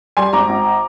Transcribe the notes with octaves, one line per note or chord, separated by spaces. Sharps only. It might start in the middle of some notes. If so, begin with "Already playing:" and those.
G3 G#5 C6
G#1 A#5 D6
G#1